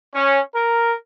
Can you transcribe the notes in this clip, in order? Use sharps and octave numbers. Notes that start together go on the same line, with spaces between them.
C#4
A#4